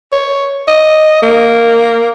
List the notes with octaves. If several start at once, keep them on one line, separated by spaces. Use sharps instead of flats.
C#5
D#5
A#3